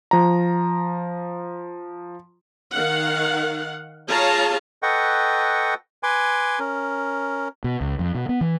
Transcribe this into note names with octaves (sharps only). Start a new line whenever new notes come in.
F3 A#5
D#3 F5 F#5
F4 G#4 C#5 F5 A5 A#5
A4 B4 D#5 F#5 G5 C#6
B4 G#5 C6 D6
C#4 A#4
B2
C#2
F2
B2
B3
E3